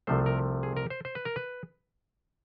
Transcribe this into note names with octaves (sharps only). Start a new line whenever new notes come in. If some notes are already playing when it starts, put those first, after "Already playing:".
C2 C3 F3 A3 C5
A#4
G#4
A#4
C5
C5
B4
A#4
B4